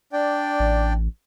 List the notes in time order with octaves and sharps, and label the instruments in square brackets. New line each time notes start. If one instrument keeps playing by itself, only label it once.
[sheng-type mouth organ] D4 D5 G5
[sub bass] A1